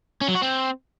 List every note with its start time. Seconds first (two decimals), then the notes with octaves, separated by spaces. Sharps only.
0.21 C#4
0.28 F#3
0.35 F#4
0.42 C4